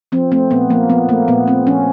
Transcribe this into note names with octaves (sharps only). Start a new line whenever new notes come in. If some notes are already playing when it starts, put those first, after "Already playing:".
F3 C4
A3 C4
A#2 B3
F3 A#3
F3 B3
A3 A#3
A#2 B3
A3 C4
F3 C#4